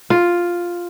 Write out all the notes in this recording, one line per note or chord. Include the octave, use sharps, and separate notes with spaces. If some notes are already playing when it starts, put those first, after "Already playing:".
F4